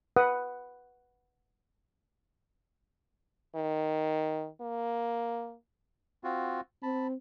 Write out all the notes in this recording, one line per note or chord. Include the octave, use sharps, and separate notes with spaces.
B4 F#5 B5 D#6
D#3
A#3
C4 F4 F#4
C4 A5 B5